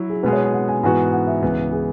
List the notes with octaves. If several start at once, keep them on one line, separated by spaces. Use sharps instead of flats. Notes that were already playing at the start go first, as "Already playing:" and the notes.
Already playing: F#3 E4 F#4
G#4
B2 G#3 B3 G#4 B4
C#5
G#5
F#5
G#5
G#2 E3 B3 F#4 G#5
F#5
E5
C#2 C#3 E3 B3
G#4